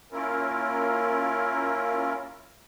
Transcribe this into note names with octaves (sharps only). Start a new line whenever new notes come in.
A#3 C#4 E4 F4 A#4